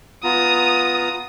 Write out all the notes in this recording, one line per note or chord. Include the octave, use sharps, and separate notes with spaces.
B3 F4 A#5 D#6